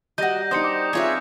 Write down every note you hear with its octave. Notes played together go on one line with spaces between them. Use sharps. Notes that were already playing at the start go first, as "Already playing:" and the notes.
G3 F#4 A#4 D#5 G6 A#6
D4 D#4 C5 G5 D#6 C#7
D6 C#7
C4 F4 G#4 B4 C#5 E5